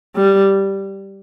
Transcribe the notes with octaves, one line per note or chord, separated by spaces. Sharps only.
G3